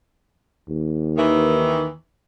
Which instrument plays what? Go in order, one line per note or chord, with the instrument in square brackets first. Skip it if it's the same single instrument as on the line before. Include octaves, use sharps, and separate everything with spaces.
[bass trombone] D#2
[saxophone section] D#3 E3